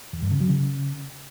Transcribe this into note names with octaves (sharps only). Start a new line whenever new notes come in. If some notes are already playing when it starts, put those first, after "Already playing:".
E2
G2
C#3
F#3
C#3